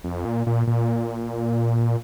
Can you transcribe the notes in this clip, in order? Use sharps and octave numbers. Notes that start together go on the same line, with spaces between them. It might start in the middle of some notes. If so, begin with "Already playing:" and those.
F2
A#2
A#2
A#2